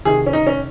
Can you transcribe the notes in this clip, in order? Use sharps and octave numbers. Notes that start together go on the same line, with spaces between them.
C3 D#3 G#4
C#4
D#4
C#4